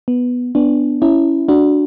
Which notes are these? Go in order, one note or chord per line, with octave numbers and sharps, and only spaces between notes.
B3
B3 D4
C#4 E4
D4 F#4